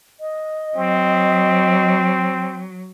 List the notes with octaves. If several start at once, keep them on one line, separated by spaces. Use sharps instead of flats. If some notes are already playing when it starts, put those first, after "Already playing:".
D#5
F#3 C4